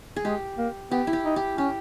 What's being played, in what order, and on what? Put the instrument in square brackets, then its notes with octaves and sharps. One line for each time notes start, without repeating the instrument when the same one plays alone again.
[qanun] G#4
[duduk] G#3 [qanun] G4
[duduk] A#3
[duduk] B3 [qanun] G4
[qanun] E4
G4
[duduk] D#4
[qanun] G4
[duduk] C#4 [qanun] G4